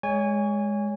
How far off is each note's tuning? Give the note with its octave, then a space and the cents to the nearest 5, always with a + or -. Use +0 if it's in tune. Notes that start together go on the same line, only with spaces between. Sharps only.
G#3 +0 C#5 +25 G#5 -20